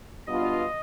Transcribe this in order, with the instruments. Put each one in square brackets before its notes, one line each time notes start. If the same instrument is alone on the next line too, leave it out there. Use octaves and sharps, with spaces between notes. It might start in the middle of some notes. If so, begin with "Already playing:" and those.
[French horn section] B2 G3 B3 D4 F4 [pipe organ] D#5